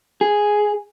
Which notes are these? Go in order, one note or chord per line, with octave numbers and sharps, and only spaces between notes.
G#4